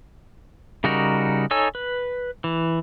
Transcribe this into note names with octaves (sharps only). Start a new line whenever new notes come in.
C#3 G3 D#4 F#4 A#4
D#4 A4 C#5 G#5 E6
B4
E3